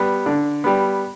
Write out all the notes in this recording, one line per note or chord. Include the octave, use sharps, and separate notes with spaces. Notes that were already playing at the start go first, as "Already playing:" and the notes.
Already playing: G3 B3
D3
G3 B3